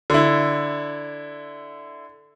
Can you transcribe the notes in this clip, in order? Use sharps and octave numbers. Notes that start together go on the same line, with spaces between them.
D3 E4